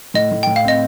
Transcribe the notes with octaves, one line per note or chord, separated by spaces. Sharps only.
A2 D#5
A2
A2 G5
F5
C4 D#5